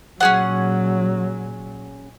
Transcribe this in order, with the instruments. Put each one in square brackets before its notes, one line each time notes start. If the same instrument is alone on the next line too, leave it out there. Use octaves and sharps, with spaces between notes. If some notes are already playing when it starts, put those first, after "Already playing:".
[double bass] A#2 F#3 [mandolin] C#4 G#4 F#5